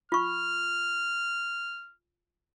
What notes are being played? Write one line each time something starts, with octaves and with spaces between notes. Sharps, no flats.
F4 C#6 F6